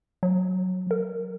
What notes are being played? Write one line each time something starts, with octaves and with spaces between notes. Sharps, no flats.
F#3
A#4